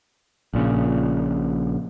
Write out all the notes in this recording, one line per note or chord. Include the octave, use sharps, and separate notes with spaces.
A#1 A#2 C#3